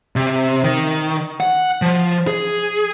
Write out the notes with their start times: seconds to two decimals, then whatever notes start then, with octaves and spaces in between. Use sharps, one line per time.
0.16 C3
0.64 D#3
1.40 F#5
1.82 F3
2.27 G#4